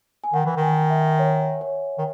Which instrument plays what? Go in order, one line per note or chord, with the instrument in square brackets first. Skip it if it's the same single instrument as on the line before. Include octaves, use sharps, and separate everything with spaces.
[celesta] G#5
[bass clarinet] D#3 [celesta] F#5
[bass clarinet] E3
D#3
[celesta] G#5
E5
C#5
C#5
[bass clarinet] D#3